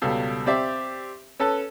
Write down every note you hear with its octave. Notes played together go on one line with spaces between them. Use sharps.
C#2 B2 G3 A4
C4 G4 D5 E5
C#4 A4 B4 A5